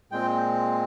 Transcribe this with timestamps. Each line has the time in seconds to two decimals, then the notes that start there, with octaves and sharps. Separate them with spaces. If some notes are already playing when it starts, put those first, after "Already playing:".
0.11 A#2 G#3 C4 G5